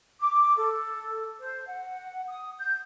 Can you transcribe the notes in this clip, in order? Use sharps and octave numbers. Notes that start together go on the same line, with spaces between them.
D6
A4
C5
F#5
D#6
G6